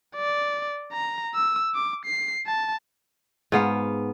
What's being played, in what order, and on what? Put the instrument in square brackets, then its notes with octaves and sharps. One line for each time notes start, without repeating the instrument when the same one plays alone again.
[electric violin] D5
A#5
E6
D6
C7
A5
[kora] G#2 B3 F5